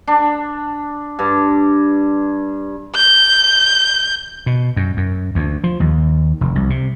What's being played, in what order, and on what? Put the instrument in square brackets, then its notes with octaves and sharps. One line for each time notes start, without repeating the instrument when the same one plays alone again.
[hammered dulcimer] D4
G2
[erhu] G6
[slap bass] B2
F#2
F#2
D2
F3
D#2
F1
C2
C3